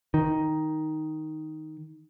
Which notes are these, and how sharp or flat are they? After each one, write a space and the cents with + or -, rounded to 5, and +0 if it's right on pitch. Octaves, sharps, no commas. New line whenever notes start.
D#3 +5